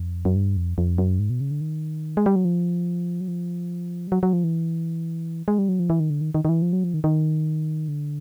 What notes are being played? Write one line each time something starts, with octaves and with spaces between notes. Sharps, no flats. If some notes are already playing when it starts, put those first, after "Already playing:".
Already playing: F2
F#2
G2
F2
F2
F#2
G#2
B2
C#3
D3
D#3
G#3
G3
F#3
F3
F#3
F3
G3
F#3
F#3
F3
E3
G#3
G3
F#3
F3
E3
D#3
D3
D#3
D#3
D#3
E3
F3
F#3
F3
D#3
D#3
D3